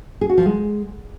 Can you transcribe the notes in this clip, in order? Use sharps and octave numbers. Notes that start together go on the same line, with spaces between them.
G#4
F#4
F3
G#3